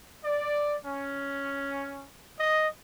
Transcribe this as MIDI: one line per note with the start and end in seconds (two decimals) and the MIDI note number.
0.25 0.77 74
0.85 2.07 61
2.39 2.69 75